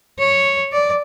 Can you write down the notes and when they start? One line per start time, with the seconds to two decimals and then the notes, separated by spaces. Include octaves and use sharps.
0.19 C#5
0.72 D5